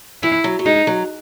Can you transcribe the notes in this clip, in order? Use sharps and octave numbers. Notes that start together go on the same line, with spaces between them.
E3 E4
F#3
F#3
G#3 D#4
F#3